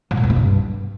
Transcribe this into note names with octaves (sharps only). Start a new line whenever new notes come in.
A2
A#2
E2
B2
G2